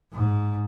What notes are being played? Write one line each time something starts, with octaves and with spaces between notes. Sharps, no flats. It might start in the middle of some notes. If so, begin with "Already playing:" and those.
G#2